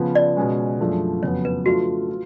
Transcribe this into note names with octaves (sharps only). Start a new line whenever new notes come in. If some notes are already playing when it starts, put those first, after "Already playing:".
Already playing: C#3 F3 B3
D5
B2 G#3 C#4
F#2 F3 A3 D4 G#4
F2 C#3 F#3 B3 C#5
B4
F3 A3 D4 F4 F#4
F4